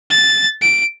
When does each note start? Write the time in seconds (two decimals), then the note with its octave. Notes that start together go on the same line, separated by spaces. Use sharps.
0.11 A6
0.62 D7